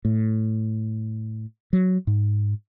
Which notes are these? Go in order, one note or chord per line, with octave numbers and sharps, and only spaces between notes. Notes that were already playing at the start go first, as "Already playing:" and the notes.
A2
F#3
G#2